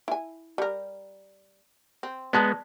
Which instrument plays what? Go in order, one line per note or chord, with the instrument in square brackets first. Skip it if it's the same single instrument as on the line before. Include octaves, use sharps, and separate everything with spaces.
[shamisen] E4 G#5
G3 A#4
C4
[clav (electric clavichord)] G#3 B3 [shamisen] D5 A5 A#5